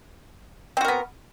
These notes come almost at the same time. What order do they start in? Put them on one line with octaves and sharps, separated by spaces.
C4 F#4 A#4 B3